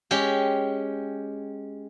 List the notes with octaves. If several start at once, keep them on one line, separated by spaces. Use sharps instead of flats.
G#3 C#4 G4